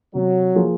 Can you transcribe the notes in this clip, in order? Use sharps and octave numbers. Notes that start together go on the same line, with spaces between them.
C3 F#3
F3 A#3 F4 G#4